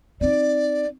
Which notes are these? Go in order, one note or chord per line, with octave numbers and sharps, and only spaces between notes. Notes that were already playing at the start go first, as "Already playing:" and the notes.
C4 D#4 D5